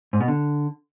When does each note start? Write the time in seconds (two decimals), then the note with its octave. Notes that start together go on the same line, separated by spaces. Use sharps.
0.13 G#2
0.20 B2
0.28 D3